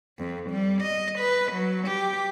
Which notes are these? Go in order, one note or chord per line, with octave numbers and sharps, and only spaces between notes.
F2
G3
D#5
B4
F#3
G4